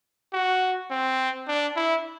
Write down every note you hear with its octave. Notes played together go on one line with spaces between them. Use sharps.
F#4
C4
D4
E4